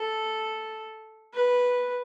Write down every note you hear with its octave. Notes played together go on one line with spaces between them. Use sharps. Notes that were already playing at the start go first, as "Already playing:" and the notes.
Already playing: A4
B4